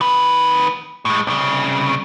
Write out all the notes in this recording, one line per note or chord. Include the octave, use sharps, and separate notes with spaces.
D#3 B4
A2 G#3
C2 C#3